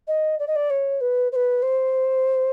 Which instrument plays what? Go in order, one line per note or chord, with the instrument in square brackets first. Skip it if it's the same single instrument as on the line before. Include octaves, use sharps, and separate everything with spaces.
[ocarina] D#5
D5
D#5
D5
C#5
B4
C5
B4
C5